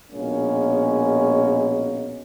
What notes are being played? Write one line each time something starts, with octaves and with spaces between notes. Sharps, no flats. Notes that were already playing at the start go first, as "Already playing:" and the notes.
A#1 B2 G#3 A#3 C#4